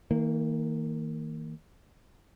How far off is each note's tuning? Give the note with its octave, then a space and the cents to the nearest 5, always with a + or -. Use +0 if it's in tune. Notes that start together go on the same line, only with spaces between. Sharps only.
D#3 +35 A#3 -20